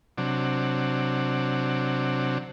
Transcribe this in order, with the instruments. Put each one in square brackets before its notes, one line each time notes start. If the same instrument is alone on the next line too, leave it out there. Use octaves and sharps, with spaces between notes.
[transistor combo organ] C3 F#3 D4